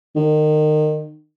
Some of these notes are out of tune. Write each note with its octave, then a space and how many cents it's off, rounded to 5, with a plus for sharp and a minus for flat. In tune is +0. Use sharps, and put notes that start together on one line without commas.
D#3 -30